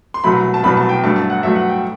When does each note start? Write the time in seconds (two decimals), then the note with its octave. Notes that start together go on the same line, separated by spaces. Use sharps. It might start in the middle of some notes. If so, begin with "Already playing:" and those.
0.14 C6
0.24 C2 B2 F#3 A3 B5
0.54 A5
0.63 C2 B2 F#3 A3 B5
0.77 A5
0.89 G5
1.03 G2 F#3 A3 A5
1.16 A5
1.30 F#5
1.43 G2 F#3 A3 E5
1.56 F#5
1.69 G5